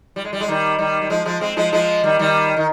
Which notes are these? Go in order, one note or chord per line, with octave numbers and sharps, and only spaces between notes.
G3
G#3
G3
G#3
D#3 G3
D#3 G3
G3
F3 G#3
F3 G#3
G#3 C4
F3 G#3
F3 G#3
D#3 G3
D#3 G3
D#3